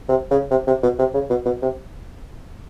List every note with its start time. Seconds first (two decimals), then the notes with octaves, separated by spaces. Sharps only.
0.09 C3
0.31 C#3
0.51 C3
0.67 C3
0.83 B2
0.99 C3
1.14 C#3
1.30 B2
1.46 B2
1.63 C3